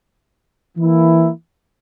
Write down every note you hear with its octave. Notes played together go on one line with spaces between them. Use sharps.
E3 A#3 E4